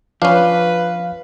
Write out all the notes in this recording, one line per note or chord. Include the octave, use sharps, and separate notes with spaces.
F3 C#4 D4 B4 F5